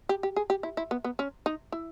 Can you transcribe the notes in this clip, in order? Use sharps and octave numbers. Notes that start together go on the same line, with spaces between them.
G4
G4
G#4
G4
E4
E4
B3
B3
C#4
D#4
E4